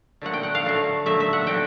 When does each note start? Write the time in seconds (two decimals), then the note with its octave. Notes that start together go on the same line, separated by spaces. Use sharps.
0.21 D3 F#3 A3 F#5
0.33 G5
0.43 F#5
0.55 F5
0.65 D3 F#3 A3
1.06 D3 F#3 A3 E5
1.20 E5
1.33 F#5
1.47 D3 F#3 A3 G5